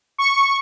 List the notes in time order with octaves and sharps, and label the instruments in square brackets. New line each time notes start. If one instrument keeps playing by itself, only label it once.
[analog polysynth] C#6